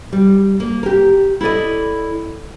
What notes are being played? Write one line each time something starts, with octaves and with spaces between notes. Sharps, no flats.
G3
A#3
G4 A#4
E4 A4 D5 D#5